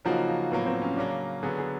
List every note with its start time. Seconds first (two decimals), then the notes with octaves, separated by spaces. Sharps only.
0.05 C#3 F3 F#3 A#3 D#4 F#4
0.28 F3
0.51 A2 F#3 A#3 B3
0.66 C4
0.82 C#4
0.97 C#3 F#3 A#3 D4
1.43 D3 F#3 B3 G#4
1.59 G#4